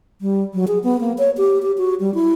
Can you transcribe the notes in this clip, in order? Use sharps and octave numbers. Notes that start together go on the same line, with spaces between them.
G3
F#3
G#4
B3
A#3
C#5
G4
G4
F#4
G3
E4